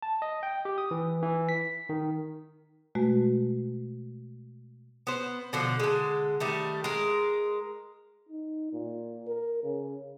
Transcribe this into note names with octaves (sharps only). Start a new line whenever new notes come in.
A5
D#5
G5
G4
D#6
E3
E3
B6
D#3
B2 G#3 A3 F#4
B3 C5
B2 D3 F3
D3 G#3
D#3 G3 A3
G#3 A#4
D#4
A#2
A#4
C#3